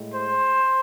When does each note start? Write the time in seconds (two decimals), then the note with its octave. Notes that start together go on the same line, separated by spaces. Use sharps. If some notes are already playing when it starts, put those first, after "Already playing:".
Already playing: A2 G#3
0.13 C5